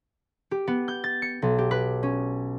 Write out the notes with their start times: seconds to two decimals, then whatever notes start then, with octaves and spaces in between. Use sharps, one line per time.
0.51 G4
0.67 B3
0.88 G6
1.04 A6
1.22 C#7
1.42 B1
1.58 G4
1.71 B4
2.03 C#4